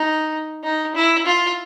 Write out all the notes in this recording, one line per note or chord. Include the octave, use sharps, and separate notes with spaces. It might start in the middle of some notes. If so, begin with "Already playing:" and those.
Already playing: D#4
D#4
E4
F4